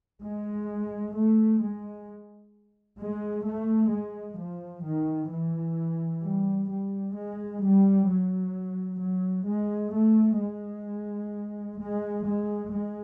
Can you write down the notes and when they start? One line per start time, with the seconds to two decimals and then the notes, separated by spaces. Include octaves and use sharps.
0.21 G#3
1.15 A3
1.60 G#3
2.99 G#3
3.46 A3
3.92 G#3
4.38 F3
4.84 D#3
5.31 E3
6.23 G3
6.70 G3
7.16 G#3
7.62 G3
8.09 F#3
9.00 F#3
9.47 G#3
9.93 A3
10.39 G#3
11.79 G#3
12.25 G#3
12.71 G#3